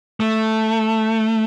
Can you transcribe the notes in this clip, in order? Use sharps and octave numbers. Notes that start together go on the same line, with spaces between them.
A3